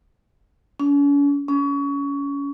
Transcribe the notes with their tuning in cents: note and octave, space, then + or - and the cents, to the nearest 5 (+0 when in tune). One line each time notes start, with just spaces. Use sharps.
C#4 +45
C#4 +25